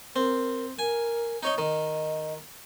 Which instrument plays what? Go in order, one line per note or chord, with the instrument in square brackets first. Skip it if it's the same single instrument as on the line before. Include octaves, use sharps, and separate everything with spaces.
[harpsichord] C4 [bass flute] A#4
[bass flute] A#4 [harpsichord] G#5
[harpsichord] D#4 C#5 D#5
[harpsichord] D#3 [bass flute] D#5